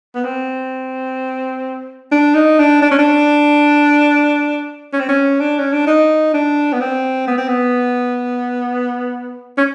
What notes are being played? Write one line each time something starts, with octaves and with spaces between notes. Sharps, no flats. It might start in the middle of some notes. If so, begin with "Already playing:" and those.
B3
C4
D4
D#4
D4
D4
C#4
D4
C#4
C4
C#4
D4
C#4
D4
D#4
D4
B3
C4
B3
C4
B3
C#4